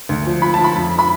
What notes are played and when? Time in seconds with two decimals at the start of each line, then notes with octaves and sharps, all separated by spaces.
0.09 D2
0.26 F3
0.42 F3 B5
0.54 A5
0.59 F3
0.64 B5
0.75 F2
0.99 B5